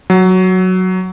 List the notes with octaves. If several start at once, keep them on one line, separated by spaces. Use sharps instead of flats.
F#3